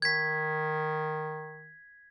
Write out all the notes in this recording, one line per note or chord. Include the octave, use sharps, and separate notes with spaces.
D#3 G#6 B6